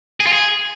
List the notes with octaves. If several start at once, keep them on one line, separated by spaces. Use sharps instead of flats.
G#4
F4
G#4